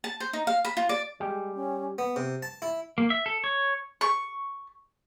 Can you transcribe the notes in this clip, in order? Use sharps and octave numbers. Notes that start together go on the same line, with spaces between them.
A5
C5
D#4
F5
B5
F4
D5
G3 G#3 G4 G5
C#4
B3
C3
A5
E4
A#3
E5
A4
C#5
C#6